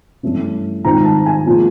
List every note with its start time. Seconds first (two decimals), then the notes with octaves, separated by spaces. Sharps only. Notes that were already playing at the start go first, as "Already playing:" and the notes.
0.23 G2 E3 A3 C#4
0.85 G#2 D#3 G3 C4 F4 A#5
1.05 A5
1.26 G#5
1.46 A#2 F3 G#3